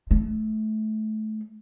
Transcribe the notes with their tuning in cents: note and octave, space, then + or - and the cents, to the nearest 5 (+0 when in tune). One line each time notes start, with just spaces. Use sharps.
A3 -25